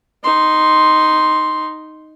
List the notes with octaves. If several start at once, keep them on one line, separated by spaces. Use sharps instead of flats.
D#4 C6